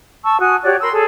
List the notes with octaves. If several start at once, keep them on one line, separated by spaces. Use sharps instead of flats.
A5 C#6 E6
F#4 G#5 D#6
F#4 G4 C#5 D5
A#4 B5 C6 E6
G#4 A4